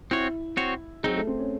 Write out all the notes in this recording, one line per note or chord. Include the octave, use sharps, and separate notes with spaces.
C4 E4 F#4 C#5
C4 F#4 C#5
F#3 C4 D#4 G#4
A3
C4
C#4